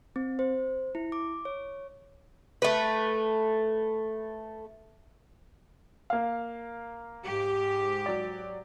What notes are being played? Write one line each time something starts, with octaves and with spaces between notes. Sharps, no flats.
C4
C5
E4
D6
C#5
A3 B4
A#3 F5
G#2 G4
F#3 D5